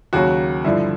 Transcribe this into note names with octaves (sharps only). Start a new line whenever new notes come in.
D#2 C#3 F#3 F#4
G2 D3 F3 E4